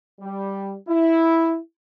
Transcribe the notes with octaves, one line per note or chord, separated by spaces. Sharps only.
G3
E4